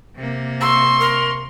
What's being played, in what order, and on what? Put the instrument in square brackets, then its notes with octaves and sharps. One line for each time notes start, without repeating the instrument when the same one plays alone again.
[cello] C3 A#3
[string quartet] C6 C#6 [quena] E6
[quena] A#4